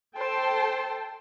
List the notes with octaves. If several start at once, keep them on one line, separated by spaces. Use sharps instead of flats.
A4 C5 G5 A5